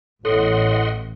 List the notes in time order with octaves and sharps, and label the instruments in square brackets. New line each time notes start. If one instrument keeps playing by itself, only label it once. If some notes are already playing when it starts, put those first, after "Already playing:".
[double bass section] A1 [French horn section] E2 E4 C#5 [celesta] A4 [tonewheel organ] D#5 F#5 C6